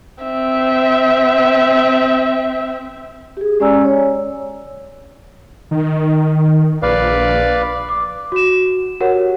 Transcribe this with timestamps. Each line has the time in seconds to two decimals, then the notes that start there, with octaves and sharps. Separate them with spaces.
0.23 C4 E5
3.37 G4 G#4
3.60 G#3 C#4 D5 G#5 A#5 E6
3.84 C#5
5.71 D#3
6.82 A#1 B4 D5 F5
7.89 D6
8.32 F#4 E7
9.00 F#4 G4 A#4 C#5 F#5